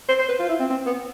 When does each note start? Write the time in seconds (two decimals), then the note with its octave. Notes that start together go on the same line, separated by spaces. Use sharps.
0.09 C5
0.19 C5
0.29 B4
0.40 F4
0.49 E4
0.60 C4
0.70 C4
0.86 B3